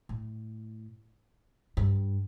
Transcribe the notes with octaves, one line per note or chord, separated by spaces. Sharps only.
A2
G2